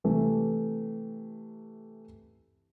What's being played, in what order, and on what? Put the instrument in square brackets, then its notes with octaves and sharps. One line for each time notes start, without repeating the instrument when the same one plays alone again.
[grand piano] C3 E3 A3